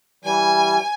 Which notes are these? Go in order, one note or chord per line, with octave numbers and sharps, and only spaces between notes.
E3 G3 G#5